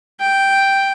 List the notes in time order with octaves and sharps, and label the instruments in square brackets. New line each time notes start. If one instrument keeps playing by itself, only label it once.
[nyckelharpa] G5